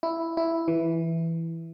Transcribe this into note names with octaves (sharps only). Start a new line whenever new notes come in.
E4
E4
E3